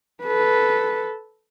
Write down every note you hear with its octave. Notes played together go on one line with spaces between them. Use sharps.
A4 B4